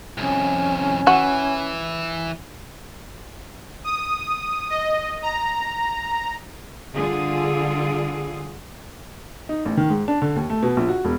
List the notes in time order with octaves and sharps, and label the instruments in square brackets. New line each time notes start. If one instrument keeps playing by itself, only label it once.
[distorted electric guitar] C2 F2 [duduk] C#4
[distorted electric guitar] E3 [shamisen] F#4
[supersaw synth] D#6
D#5
A#5
[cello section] D3 G3 F4 G#4
[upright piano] D#4
A1
D#3
G#2
D4
D3
D#2
A3
B2
A#1
F#4
E1